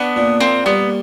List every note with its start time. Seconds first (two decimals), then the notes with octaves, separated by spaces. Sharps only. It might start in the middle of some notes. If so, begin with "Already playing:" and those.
Already playing: B3 D4
0.16 A#2
0.40 A#3 C4
0.66 G3 B3